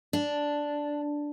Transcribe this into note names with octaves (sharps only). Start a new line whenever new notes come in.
D4